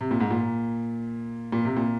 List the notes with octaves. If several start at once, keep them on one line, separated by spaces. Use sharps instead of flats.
C3
A#2
G#2
A#2
A#2
C3
A#2